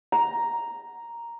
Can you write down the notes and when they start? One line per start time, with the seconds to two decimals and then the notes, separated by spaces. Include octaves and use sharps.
0.12 A#5